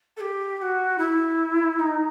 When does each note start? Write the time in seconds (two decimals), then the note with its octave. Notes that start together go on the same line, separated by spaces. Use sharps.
0.16 A4
0.20 G4
0.56 G4
0.61 F#4
0.98 E4
1.79 D#4